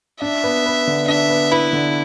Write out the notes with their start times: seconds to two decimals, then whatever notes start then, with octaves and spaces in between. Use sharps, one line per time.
0.22 D4 E5
0.44 B3
0.66 B4
0.87 D3
1.08 D4 E5
1.30 B3
1.51 E4 B4
1.73 D3